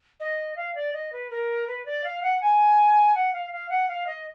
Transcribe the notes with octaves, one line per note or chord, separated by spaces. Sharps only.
D#5
F5
D5
D#5
B4
A#4
B4
D5
F5
F#5
G#5
F#5
F5
F5
F#5
F5
D#5